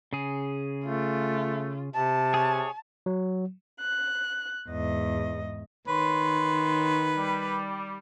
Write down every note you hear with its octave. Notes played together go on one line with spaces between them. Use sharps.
C#3 G#4
A3 F4
C3 A5
G#4 C#5
F#3
F#6
E2 G#2 D#5
D#3 B4 C#5 C6
G3